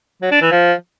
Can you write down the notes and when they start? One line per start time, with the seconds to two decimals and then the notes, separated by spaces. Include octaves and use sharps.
0.22 F#3
0.32 D4
0.41 E3
0.51 F3